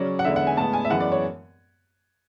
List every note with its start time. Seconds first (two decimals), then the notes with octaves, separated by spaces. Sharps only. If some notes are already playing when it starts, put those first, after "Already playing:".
Already playing: C#3 F#3 C#4 D5
0.19 F#5
0.25 E2 D3 G#3 B3 E5
0.36 F#5
0.47 G#5
0.57 A2 G#3 B3 A5
0.73 G#5
0.85 E5
0.90 F#2 E3 G#3 B3 F#5
1.00 D5
1.12 C#5